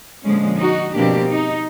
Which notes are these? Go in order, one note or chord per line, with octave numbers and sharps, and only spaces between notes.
A#2 D3 F3 G#3 C#4
D#4 F#4
B2 F3 A#3 C4 D4 G4
D#4